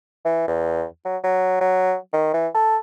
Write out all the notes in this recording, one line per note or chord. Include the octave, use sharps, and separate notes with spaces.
E3
E2
F#3
F#3
F#3
D#3
E3
A4